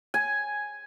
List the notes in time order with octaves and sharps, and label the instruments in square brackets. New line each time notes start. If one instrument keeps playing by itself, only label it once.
[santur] G#5